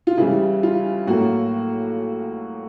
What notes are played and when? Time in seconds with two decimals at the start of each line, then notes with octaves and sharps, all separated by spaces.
0.07 F4
0.17 C#3 E3 G3 E4
0.63 F4
1.07 A2 F#3 A#3 F#4